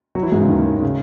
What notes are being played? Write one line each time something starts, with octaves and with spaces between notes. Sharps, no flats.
F#3 F#4
E3 E4
G#2 G#3
C#3
D#2 D#3
C#3